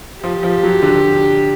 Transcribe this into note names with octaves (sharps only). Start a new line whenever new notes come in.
F3 G4
F3
F#3
D3